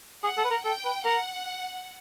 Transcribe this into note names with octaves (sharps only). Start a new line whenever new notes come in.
G#4 F#5
A4
B4
A#4
A4 G5
B4
A#4 F#5